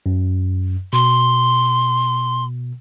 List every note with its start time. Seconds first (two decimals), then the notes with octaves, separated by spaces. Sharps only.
0.06 F#2
0.93 B2 C6